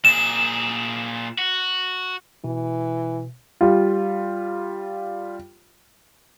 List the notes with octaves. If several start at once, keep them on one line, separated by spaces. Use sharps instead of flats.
A#2 G#4 E7
F#4
B2 E3
G3 F4